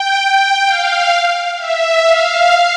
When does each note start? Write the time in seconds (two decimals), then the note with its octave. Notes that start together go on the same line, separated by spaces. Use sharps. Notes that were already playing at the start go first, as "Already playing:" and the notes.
Already playing: G5
0.66 F5
1.58 E5
2.03 F5